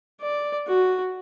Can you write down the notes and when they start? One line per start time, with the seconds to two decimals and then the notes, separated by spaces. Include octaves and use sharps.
0.21 D5
0.67 F#4